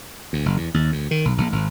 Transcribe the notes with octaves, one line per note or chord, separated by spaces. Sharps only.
D2
F#1
E2
D#2
D2
D#3
B1
A#1
G#1